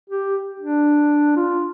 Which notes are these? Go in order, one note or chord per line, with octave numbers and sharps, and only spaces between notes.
G4
D4
F4